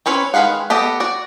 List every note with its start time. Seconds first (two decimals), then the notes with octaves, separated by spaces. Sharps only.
0.06 C4 C#4 B4 C#5
0.34 D#3 G#3 B4 F5 F#5
0.70 B3 G4 A4 D#5
1.00 F#4 D5